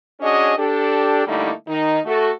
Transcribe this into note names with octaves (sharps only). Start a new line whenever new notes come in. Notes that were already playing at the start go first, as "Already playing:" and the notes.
C#4 D4 F#4 G#4 C#5 D#5
D4 G4 A4
D3 G3 A3 A#3 D#4 E4
D#3 D#4
A3 F#4 A4